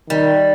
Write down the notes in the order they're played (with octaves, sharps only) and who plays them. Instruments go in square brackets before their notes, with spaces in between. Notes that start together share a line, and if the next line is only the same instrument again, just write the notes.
[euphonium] D#3 [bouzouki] G3